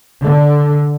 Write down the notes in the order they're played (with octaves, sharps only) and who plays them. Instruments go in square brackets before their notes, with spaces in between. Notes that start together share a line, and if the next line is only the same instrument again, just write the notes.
[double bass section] D3